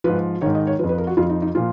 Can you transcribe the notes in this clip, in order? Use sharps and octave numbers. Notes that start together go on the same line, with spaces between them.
G#2 F3 B4
G#2 D#3 C#5
D#5
C#5
F2 F3 B4
B4
A#4
F#4
F2 F3 F4
D#4
D#4
A#2 F3 F4